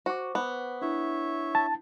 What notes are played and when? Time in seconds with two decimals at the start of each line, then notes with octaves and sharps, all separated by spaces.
0.06 F#4 C5 C#6 D6
0.35 B3
0.82 D4 E4 C#5 E5
1.55 A5